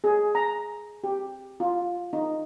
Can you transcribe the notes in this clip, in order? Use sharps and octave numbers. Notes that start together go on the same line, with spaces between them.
G#4
A#5
G4
F4
D#4